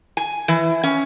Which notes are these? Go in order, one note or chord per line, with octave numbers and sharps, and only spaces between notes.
G#5
E3
C#4